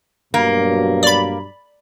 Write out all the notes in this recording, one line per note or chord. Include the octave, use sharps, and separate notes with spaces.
G2 B2 F#3 A#3
D5 B5